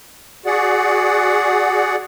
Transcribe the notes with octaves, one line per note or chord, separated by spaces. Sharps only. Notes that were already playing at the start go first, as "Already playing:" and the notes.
F#4 G#4 D5 F#5